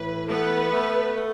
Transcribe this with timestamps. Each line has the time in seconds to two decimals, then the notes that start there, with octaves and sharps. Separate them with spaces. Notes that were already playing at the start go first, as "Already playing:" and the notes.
Already playing: A2 E3 B4
0.28 A3 B3 B4
0.73 A3
1.17 A3